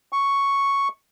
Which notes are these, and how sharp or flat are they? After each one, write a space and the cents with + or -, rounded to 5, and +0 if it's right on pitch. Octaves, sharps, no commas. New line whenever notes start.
C#6 +0